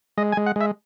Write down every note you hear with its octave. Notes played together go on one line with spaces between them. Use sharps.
G#3 D#5
G#5
G#3
F#5
G#3 E5